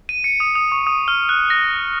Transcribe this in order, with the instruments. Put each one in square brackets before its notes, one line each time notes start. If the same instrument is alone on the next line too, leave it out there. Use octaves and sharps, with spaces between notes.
[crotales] D#7
C#7
D#6
D#6
C#6
D#6
F6
F#6
A#6